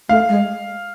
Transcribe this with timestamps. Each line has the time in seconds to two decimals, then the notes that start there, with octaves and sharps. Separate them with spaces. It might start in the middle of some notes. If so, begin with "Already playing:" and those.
0.09 A3 F5
0.29 G#3